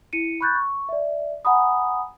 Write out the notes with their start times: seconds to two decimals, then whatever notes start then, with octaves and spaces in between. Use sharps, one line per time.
0.13 E4 C#7 D#7
0.41 B5 C#6 F#6 G6 A6
0.56 C#6
0.89 D5 E5
1.45 F#5 G#5 A#5 B5 D#6